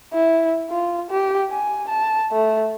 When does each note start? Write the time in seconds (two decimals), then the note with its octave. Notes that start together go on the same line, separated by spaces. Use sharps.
0.13 E4
0.70 F4
1.11 G4
1.50 G#5
1.89 A5
2.32 A3